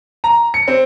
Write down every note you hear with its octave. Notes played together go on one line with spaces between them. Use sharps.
A#5
C#7
C4